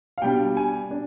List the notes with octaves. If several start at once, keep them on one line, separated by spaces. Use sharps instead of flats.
F5
B2 G3 D4 G5
G#5
D4